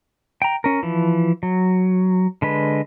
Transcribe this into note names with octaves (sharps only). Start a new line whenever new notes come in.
G5 A#5
C#4 A#4
E3 F3
F#3
D3 G#3 B4